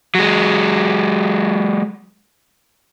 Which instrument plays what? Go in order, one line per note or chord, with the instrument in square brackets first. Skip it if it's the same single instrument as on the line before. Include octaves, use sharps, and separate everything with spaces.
[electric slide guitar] F#3 G#3